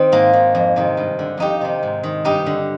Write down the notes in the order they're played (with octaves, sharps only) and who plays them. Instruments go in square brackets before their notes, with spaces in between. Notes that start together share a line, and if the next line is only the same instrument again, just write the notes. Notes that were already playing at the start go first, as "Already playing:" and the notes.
Already playing: [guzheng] D#3 C4
G#2 A#3
D#3
F2
C3 D#3
G2
D3
F2 D#4 G4
C3 D#3
G#2
D#3
G2 D#4 G4
D3